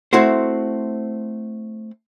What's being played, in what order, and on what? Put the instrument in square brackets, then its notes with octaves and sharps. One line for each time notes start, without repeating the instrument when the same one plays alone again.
[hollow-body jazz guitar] A3 C4 E4 F#4 C5